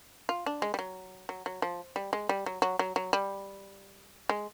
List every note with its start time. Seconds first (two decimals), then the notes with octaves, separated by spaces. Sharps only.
0.29 F4
0.46 D4
0.62 G#3
0.74 G3
0.79 F#3
1.29 F#3
1.46 F#3
1.62 F3
1.96 G3
2.13 G#3
2.29 G3
2.46 F#3
2.62 F#3
2.79 F#3
2.96 F#3
3.13 G3
4.29 G#3